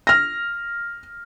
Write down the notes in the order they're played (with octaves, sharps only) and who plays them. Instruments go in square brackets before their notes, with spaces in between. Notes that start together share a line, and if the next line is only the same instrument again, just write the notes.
[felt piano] F6 A#6